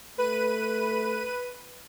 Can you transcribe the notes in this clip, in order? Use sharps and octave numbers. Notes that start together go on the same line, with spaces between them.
A3 B4 D#7